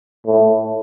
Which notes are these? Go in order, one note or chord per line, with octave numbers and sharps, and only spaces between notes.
A2